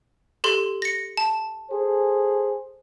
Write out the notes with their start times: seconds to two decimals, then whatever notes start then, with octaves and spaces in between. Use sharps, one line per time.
0.44 G4 A4 C6
0.82 A#6 C#7
1.17 A5
1.71 G#4 A4 C5